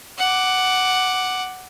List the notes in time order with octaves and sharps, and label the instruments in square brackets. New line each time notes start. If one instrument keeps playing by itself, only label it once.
[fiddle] F#5 D6